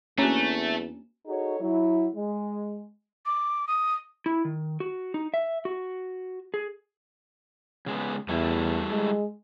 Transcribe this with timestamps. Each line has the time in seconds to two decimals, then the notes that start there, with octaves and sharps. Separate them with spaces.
0.18 E2 A3 A#3 C#4 D4 F#4 A#5
1.26 D#4 F#4 G#4 A4 C#5
1.61 F#3 E4
2.15 G#3
3.26 D6
3.67 D#6
4.26 E4
4.45 D#3
4.80 F#4
5.14 D#4
5.34 E5
5.65 F#4
6.54 G#4
7.86 C#3 G#3 B3
8.29 E2 G3 A3 E4
8.90 G#3